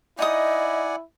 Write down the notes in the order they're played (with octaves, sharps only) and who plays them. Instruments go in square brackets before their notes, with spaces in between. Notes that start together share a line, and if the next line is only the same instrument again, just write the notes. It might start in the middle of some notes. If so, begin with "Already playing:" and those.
[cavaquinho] D#4 D#6 [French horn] E4 [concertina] D5 F#5 G#5 [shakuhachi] D#5